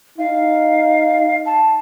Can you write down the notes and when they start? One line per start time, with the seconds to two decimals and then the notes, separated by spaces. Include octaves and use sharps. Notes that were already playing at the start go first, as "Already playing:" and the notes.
0.18 D#4 F5
1.46 A5